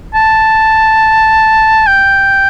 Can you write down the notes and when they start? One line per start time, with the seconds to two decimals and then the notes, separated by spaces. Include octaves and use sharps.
0.14 A5
1.87 G5